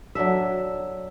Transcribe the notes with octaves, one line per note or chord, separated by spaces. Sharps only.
F#3 D4 A4 E5